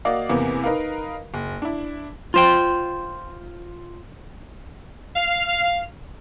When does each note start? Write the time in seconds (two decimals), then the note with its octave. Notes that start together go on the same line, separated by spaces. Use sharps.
0.05 A#3 F#4 D5 D#5 F5
0.29 E2 C3 A#3 B3
0.64 D#4 A#4 B4 F5
1.34 F#1
1.62 D4 E4
2.34 F4 C5 G5
5.16 F5